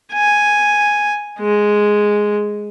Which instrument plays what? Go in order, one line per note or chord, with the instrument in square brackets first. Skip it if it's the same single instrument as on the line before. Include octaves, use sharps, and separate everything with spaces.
[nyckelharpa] G#5
G#3